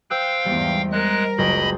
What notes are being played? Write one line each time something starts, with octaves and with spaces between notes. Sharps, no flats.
C5 F5 G5 E6 F#6
E2 G#2 G3
G#3 A#4 F#6
F#1 C#2 D#5 B5